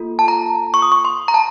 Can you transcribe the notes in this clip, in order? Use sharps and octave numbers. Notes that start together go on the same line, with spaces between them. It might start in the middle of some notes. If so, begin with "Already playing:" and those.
Already playing: A#3 F4 A4
A5
A#5
C#6
D#6
C#6
C6
A#5
A5